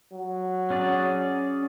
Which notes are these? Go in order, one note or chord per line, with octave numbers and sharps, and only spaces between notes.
F#3
C#4 G#4 D5